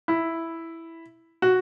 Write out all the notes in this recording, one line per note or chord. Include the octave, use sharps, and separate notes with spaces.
E4
F#4